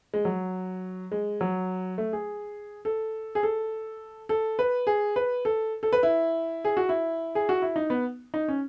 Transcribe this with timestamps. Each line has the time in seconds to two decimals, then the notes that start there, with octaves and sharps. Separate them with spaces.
0.14 G#3
0.25 F#3
1.12 G#3
1.41 F#3
1.98 A3
2.13 G#4
2.85 A4
3.35 G#4
3.43 A4
4.29 A4
4.59 B4
4.87 G#4
5.16 B4
5.45 A4
5.83 A4
5.93 B4
6.03 E4
6.65 G#4
6.77 F#4
6.89 E4
7.35 G#4
7.49 F#4
7.62 E4
7.76 D#4
7.90 B3
8.34 D#4
8.48 C#4